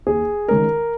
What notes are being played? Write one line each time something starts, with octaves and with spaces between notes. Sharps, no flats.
D#2 G#4
D#3 G#3 C#4 A#4